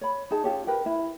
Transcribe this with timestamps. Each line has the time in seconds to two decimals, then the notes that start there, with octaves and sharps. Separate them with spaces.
0.01 C#5 B5
0.31 D#4 G#4 A5
0.44 C#4 F4 G4 C#5
0.67 A#4 B4 G5
0.86 E4